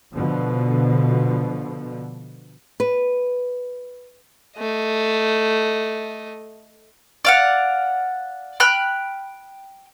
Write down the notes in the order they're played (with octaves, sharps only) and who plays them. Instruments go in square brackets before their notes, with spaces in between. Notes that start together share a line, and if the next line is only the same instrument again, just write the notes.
[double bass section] B2 D3 F3
[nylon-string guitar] B4
[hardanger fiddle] A3 D#5
[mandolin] D5 F5 F#5
G5 B5 F6 F#6